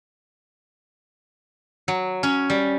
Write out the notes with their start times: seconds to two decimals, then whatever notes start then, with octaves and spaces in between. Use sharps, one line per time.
1.88 F#3
2.23 C#4
2.50 G3